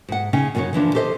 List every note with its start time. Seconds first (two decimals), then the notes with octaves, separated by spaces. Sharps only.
0.08 G#2 F#5
0.33 C#3 C#4 D#4 G5
0.55 F#2 C#3 A3 C#4 D#4 C#5
0.73 D3 E3 F3 D4
0.95 G4 A4 C5 C#5 D#5